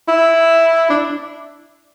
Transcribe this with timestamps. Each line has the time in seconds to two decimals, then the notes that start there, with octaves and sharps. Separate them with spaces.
0.08 E4
0.90 D4